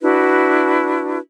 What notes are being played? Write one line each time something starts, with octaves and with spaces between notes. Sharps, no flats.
D4 E4 F#4 B4